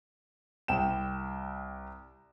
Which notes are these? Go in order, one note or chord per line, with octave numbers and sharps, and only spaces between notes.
C2 G5 E7